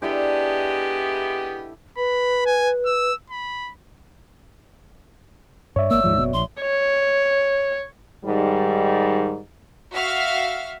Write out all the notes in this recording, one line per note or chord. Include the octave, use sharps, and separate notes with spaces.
G#3 B3 D4 E4 G4 A4
B4 B5
G#5
E6
B5
G2 C#5 D5 E5
G#1 A#3 E6
D#2 G#2 F3
F#1 B2
A#1 C6
C#5
G#2 D#3 G3
F#4 E5 F5 F6